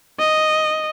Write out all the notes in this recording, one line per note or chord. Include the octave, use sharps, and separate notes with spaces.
D#5